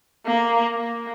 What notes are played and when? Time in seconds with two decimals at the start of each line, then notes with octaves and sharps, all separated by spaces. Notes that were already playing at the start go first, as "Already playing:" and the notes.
0.26 A#3
0.75 A#3